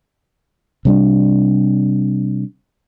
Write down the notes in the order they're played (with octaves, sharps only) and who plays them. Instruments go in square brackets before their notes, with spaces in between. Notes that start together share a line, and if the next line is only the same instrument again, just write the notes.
[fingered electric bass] C3 G3 D4